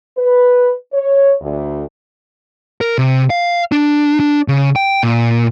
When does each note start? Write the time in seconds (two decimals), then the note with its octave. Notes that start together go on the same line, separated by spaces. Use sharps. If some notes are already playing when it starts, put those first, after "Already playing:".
0.18 B4
0.93 C#5
1.41 D2
2.81 A#4
2.98 C3
3.30 F5
3.72 D4
4.20 D4
4.48 C#3
4.76 G5
5.03 A#2